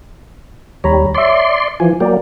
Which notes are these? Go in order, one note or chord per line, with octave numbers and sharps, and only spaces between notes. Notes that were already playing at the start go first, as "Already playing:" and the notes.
D#2 G3 C#5 A#5 B5
C#5 D5 E5 C6
E3 F3 G#5
F#3 A#3 D5 G5